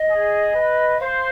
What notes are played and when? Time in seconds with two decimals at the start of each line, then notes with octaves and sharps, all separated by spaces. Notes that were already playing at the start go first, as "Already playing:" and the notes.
Already playing: D#5
0.08 G#4
0.53 B4
0.99 C5 F5